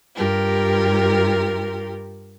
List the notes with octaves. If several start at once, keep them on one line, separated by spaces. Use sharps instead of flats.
G2 F4 G4 A#4